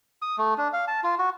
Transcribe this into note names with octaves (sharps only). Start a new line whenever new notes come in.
D#6
A3
D4
F5
A5
F4
F#4